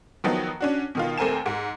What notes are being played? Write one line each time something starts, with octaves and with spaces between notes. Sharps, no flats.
D#3 F3 F#3 B3 D#4
C#4 D4 F#4
B2 D#3 F4
D#2 A3 C4 A#4 G#5 E7
G#2